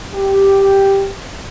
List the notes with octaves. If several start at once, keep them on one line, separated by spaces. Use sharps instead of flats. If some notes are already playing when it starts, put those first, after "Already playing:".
G4